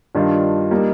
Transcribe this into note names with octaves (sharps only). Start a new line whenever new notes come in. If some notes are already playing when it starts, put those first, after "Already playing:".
G2 D#3 G3 D4 F4
G3 A#3 D#4